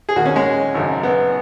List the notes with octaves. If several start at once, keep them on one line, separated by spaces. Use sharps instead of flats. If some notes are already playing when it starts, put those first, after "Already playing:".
G#4
D#2 D#3 F#4
C#4
G#3
G#1 F#2 C#3
B3